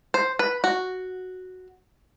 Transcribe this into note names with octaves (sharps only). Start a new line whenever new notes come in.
C5
B4
F#4